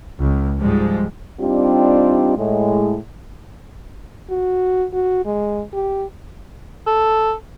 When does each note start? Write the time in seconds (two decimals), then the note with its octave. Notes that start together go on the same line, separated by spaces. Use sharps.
0.19 C#2
0.59 G#2 F3 G3 G#3
1.40 G3 C4 D4 D#4 F4 G4
2.37 A2 G#3
4.30 F#4
4.93 F#4
5.25 G#3
5.73 G4
6.87 A4